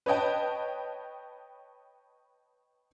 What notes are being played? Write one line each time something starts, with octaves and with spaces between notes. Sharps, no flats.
B4 C#5 D#5 G5 A5